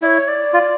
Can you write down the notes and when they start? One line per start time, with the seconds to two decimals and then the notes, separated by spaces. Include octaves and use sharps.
0.02 E4 D5
0.06 C#5
0.28 D5
0.54 F4